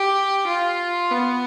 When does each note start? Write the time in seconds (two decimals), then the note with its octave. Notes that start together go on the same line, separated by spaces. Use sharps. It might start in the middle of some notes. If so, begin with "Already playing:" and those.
Already playing: G4
0.47 F4
1.11 B3